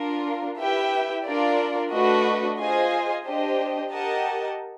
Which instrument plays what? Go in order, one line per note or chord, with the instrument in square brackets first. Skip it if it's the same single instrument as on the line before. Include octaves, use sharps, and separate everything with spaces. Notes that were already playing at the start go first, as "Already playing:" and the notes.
Already playing: [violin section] D4 F4 A#4
E4 G4 B4 E5 G5
D4 F4 A#4 D5
A3 D4 F#4 B4 D#5
F4 G#4 C5 D#5 G#5
D4 G4 C5 D#5
G4 A#4 D#5 F#5 A5